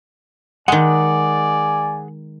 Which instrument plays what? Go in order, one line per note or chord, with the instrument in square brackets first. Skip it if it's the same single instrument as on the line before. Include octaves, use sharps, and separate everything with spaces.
[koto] D#3 G#3 [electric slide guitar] G#4 F#5 [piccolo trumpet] D5 [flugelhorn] G#5